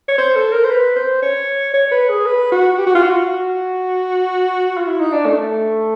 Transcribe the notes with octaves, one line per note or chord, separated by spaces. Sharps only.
C#5
C5
A4
A#4
C5
B4
C5
C#5
C#5
B4
G#4
B4
F#4
G4
F#4
F4
F#4
F4
E4
D#4
D4
A3